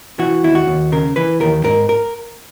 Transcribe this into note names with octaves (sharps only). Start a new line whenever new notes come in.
E3 F#4
D#2 E4
F#4
D#2
C#3 A#4
E3 B4
D#2 A#4
G#2 A#4
A#4